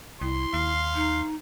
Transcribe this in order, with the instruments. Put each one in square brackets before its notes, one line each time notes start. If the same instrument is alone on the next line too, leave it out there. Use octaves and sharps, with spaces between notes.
[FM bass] C2 [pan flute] E4 [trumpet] C6
[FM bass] D#2 [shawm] F5
[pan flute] D#4